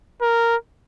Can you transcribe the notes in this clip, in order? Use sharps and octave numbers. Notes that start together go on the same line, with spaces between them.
A#4